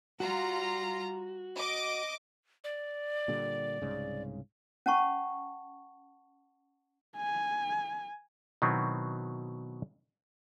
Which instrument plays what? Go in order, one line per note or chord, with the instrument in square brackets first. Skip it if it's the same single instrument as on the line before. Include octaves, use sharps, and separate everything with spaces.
[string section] G3 F4 A#5 [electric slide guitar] F#4
[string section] D#5 D6
[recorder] D5
[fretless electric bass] A#2 D3 G3
C2 G#2 C#3
[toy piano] C#4 F#5 A5 C#6
[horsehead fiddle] G#5
[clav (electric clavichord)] B2 D#3 F#3 B3 C4 E4